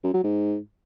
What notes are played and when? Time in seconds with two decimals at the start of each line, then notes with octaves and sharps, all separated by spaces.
0.04 F#2
0.14 F#3
0.24 G#2